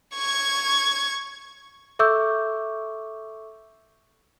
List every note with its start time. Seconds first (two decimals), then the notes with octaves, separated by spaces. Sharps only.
0.15 C#6 G#6
1.99 A4 E5 C#6 D6 E6 G6